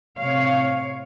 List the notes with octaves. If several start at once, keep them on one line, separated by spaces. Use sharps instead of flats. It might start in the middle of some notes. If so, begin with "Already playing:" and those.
A2 C3 C#5 F5